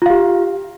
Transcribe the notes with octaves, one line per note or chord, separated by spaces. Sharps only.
F4 G4 F5